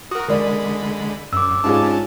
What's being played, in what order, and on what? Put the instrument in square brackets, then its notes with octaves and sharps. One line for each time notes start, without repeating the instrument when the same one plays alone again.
[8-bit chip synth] F#4 A#4 [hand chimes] D#6
[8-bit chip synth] D3 G#3 B5 [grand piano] A#4 D5
[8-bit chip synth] F#2 [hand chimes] D6 E6
[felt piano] G#2 F4 G#4 [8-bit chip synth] C#4 D4 A5